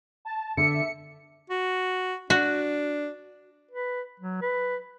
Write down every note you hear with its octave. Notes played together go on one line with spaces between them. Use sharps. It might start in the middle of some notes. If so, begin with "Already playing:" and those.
A5
D3 E5 C#7
F#4
D4 F#4
B4
F#3
B4